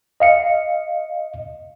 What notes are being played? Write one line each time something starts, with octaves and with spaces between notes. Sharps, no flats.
D#5 F5 C#7